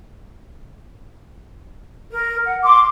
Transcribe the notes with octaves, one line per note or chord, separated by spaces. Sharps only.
A#4
F#5
C6 D6